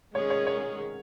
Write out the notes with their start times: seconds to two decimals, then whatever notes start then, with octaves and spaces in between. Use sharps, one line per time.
0.15 D#3 G#3 C#4 G#4 C#5
0.30 C#5
0.47 C#5